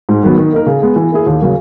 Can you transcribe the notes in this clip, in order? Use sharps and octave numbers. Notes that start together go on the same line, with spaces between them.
G#2
D#3 F#3 B3
D#3
A#3 D#4 A#4
C#3
G#3 B3
E3
A#3 E4 G#4
D#2
C#3 F#3 A#3